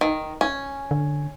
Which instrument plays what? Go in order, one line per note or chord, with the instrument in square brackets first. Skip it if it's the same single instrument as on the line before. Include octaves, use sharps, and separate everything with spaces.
[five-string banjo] D#3
C#4
[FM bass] D3